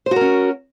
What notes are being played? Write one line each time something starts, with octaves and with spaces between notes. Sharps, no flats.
C#4 F#4 A#4 C5